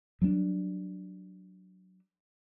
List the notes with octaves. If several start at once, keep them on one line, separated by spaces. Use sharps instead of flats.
F#3 G3 B3 D4